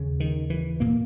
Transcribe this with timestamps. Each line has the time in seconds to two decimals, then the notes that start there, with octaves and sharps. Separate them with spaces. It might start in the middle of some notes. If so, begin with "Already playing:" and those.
Already playing: D#2 C#3
0.20 D#3
0.50 E3
0.80 A#2 A#3